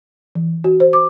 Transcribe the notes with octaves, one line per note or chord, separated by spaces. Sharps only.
E3
F#4
C5
D6